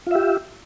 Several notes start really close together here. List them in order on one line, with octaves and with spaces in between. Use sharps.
F4 E5 G4